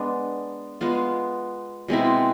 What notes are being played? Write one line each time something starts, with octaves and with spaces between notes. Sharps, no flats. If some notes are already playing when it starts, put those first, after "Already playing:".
Already playing: G#3 B3 D4
G#3 B3 F4
B2 G#3 C4 E4